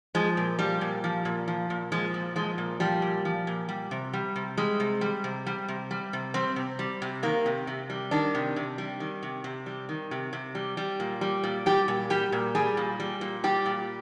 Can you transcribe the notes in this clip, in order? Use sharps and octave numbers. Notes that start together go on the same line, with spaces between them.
F3 G#3
A#2
F3 G3
A#2
F3
A#2
F3
A#2
F3 G#3
A#2
F3 G#3
A#2
F3 G3
A#2
F3
A#2
G3
C3
G3
C3
G3 G#3
C3
G3
C3
G3
C3
G3
C3
G3 C4
C3
G3
C3
D#3 A#3
C3
C3
G3
D#3 D4
C3
C3
G3
D#3
C3
C3
G3
D#3
C3
C3
G3
G3
A#2
G3
A#2
G3 G4
A#2
G3 G4
A#2
G3 G#4
A#2
G3
A#2
G3 G4
A#2